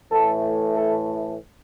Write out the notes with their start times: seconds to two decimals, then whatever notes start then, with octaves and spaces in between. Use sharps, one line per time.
0.12 A2 E3 A3 A4
0.74 A4